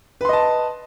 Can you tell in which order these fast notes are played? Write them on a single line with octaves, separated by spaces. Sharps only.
B4 C6 D#5 A5